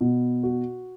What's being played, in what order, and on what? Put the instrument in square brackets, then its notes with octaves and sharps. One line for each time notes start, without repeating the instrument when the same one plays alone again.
[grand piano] B2
F#4